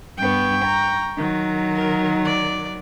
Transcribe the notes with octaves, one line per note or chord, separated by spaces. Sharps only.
G2 B3 G5 C#6
A#5
D#3 F#3
A#4
D5